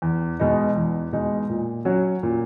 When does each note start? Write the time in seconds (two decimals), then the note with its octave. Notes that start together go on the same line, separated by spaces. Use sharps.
0.02 E2
0.39 B2 G#3 D#4
0.76 E2
1.13 B2 G#3 D#4
1.50 A#2
1.85 F#3 C#4 F#4 C#5
2.23 A#2